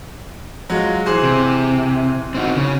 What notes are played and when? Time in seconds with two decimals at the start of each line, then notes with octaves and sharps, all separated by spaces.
0.70 F#3 G#3 F4
1.06 E3 G#4 C5
1.23 C3
2.35 C4 D#4 F#4
2.56 C#3